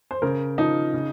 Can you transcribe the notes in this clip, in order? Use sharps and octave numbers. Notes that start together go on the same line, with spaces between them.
C5
C#3 A#4
F3 D#4
C#3